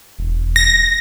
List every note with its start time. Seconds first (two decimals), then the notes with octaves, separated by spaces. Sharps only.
0.19 E1
0.56 A#6